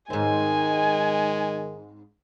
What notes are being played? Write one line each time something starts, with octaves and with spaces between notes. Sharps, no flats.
G#2 D#3 G#3 C4 G#5